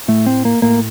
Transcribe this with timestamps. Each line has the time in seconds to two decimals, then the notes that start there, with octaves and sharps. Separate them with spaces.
0.08 A2 A3
0.26 C4
0.45 A#3
0.62 A2 A#3